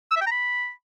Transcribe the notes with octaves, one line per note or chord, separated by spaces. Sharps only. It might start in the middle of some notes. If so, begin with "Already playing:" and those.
E6
E5
G5
A#5
B5